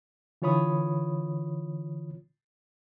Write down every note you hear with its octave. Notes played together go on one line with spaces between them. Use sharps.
D3 E3 F4 C#5 B5 D#6